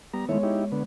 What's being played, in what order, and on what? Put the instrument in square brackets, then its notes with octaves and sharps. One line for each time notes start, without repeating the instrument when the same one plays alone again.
[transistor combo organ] G3 A#5 [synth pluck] B3
[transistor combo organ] D#3 A3 E4 [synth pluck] G#3 C#5
[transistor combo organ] D#4 E4 G4
D3 B3